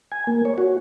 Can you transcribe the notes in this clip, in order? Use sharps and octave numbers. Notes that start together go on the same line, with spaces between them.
G#5
A#3
C#5
F#4